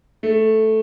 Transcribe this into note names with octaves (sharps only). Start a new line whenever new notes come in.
A3